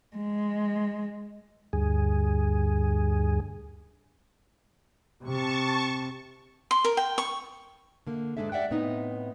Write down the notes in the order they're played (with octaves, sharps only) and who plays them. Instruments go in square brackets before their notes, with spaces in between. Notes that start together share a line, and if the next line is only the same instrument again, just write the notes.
[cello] G#3
[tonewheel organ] D2 G2 G#4
[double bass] C3 [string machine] A5 C#6
[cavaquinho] C6
A#4
G5
C#6
[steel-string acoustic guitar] D3 A#3
G#2 E3 G#3 D4 A4 E5
G4 D5 E5 F#5 G5
A2 B3 C4 D#4